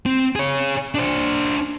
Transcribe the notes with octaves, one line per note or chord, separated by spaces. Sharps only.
C4
G#4 C#5
D4 C5